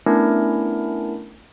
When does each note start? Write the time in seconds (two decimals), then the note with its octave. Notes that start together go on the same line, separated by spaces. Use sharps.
0.06 A3 B3 C#4 D4 E4 A#4